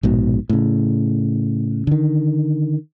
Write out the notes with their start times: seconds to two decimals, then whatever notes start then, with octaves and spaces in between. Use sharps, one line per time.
0.03 A#1 G#2 B2
0.49 A2 C#3
1.87 D3 D#3